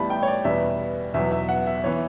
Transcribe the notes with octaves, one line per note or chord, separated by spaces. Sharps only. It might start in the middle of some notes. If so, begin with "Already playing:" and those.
Already playing: A1 A2 G3 B3 A5 B5
G5
C#5
D5
E2 B2 G3 B3 E5
E2 B2 F#3 E5
E5
F#5
E5
E3 B3 C#5